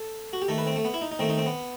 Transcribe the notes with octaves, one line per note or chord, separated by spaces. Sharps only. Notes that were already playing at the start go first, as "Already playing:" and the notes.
Already playing: A4
F#4
G4
D#3 A3 A4
B4
C4
A3
B3
E4
D#4
D#4
D#3 A3 C4
D#4
C4
B3